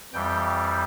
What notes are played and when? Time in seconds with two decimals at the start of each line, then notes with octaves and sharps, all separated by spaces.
0.13 F2 E3 G3 G5